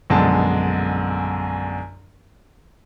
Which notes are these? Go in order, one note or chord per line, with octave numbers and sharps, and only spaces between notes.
A#1 F#2 B2 D3 G#3 A5